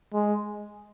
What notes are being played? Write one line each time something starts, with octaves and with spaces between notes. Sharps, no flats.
G#3